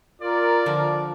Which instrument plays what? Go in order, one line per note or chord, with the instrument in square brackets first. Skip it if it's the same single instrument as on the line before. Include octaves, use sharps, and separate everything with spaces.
[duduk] F4 [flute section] A#4 [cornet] D5
[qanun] D3 F3